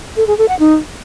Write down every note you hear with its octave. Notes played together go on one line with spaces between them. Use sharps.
A4
G#4
A4
F#5
D#4